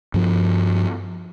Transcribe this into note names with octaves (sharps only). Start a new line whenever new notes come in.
G2 F3